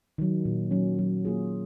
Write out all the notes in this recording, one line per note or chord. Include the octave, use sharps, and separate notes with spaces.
D#3 F#3
A#2
F#3 C#4
F#3
A#3 F4 G#4